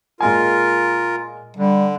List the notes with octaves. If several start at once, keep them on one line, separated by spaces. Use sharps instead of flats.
A#2 G#3 F4 A#4 G#5
D3 G3